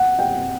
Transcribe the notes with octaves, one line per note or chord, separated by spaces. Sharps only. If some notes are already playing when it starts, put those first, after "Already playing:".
Already playing: F#5
G5